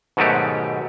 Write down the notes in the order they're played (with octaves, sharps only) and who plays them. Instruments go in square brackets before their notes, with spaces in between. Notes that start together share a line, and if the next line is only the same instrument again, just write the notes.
[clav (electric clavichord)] G#2 B2 D#3 F#3 A3 G4